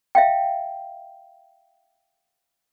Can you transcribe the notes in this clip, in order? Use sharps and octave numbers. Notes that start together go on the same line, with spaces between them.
E5 F5 G5